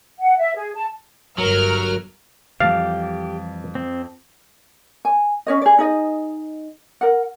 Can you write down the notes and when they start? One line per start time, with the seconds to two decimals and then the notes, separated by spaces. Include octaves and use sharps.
0.19 F#5
0.38 E5
0.56 G#4
0.75 A5
1.38 G1 F#3 A#4 F6
2.60 F2 E3 G3 G4 F5 A6
3.75 C4
5.05 G#5
5.47 C#4 C#5 D#5
5.61 G#4 D5
5.78 D#4 G#4 D#5
7.01 A#4 F#5